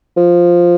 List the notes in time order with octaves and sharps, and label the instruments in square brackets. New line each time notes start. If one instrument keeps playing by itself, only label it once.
[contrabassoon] F3